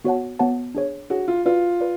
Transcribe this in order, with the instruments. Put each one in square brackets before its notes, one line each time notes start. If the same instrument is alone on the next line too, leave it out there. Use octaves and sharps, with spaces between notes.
[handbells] B3 F#4 C#5 F#5 A5
B3 F#4 C#5 F#5 A5
D4 G#4 C#5
[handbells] D4 G#4 C#5 [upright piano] F#4
[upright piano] F4
[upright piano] F4 [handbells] F#4 B4 D5
[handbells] B4 D5